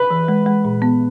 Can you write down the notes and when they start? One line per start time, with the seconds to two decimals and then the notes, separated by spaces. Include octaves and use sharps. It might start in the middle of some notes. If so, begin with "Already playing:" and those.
Already playing: B4
0.11 E3
0.28 G#3
0.46 G#3
0.65 A#2
0.82 B3